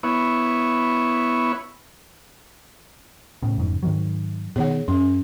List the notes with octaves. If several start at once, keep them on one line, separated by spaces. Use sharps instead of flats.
B3 E4 C#5
A2 C#3
F1 G#2 C#3
G#2 D#3 F#3
B2 D#3 G#4 C#5 F#5
F#2 C#4